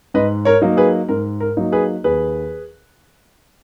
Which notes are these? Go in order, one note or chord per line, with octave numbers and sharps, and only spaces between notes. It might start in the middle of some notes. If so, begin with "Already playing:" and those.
G#2 B4 D#5
A#4 C#5
F#3 A#3 D#4
G#4 B4
G#2 A#4
A#4
F#3 A#3 D#4
G#4 B4
D#2 G#4 B4